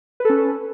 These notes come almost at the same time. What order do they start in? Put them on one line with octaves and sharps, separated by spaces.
B4 A4 C#4